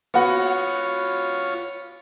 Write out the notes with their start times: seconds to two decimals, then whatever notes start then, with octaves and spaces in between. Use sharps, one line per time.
0.14 B3 F4 F#4 C#5 F#5